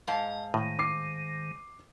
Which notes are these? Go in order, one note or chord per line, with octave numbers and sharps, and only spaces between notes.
G#2 D#5 F5 A5
A2 D#3
D6 C7